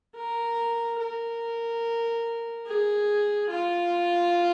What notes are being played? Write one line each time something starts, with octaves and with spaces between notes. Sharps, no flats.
A#4
A#4
G#4
F4